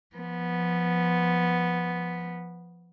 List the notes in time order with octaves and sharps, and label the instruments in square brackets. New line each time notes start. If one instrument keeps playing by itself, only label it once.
[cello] F3 B3